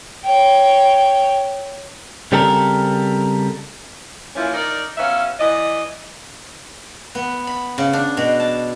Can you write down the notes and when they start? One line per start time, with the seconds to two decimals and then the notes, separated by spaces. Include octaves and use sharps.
0.24 C#5 G5
2.32 C#3 G3 C4 A4 A#4
4.36 E3 F3 A#3 C#4 E4
4.54 D#4 A#4 D5
4.97 F#3 B3 C#4 E5 F5
5.39 E3 D5 D#5
7.15 B3
7.47 B5
7.78 C#3
7.93 D4
8.17 B2
8.40 A5